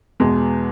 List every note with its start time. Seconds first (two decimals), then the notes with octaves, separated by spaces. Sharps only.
0.20 E2 B2 G#3